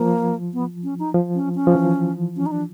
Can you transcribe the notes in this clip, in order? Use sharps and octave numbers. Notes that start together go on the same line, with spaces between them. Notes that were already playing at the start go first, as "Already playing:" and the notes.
Already playing: F3 A#3
B3
C#4
D#4
F3
C#4
C#4
F3
E3
C#4
D#4
D4